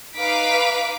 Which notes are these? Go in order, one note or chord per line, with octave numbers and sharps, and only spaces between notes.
D#4 B4 F5 D6 B6 D7